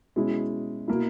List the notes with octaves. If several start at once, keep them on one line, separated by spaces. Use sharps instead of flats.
B2 G#3 C#4 E4
B2 A#3 E4